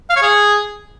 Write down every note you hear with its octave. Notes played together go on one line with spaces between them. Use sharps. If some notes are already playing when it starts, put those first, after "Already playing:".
F5
C#5
G#4